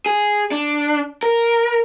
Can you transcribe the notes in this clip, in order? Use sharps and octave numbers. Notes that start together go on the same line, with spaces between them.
G#4
D4
A#4